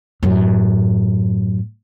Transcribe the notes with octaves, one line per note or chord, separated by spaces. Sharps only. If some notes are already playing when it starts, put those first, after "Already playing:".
F#2 A2